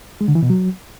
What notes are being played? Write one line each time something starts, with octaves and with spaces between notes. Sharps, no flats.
G#3
D3
E3
B2
F#3